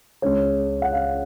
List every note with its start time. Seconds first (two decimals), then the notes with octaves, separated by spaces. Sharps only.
0.22 C#2 C#3 G#3 C#5
0.82 F#5
0.93 F5